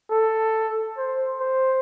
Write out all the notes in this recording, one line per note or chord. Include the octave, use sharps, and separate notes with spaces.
A4
C5
C5